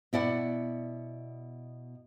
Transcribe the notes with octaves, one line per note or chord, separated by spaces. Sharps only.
B2 E4 D5 F#5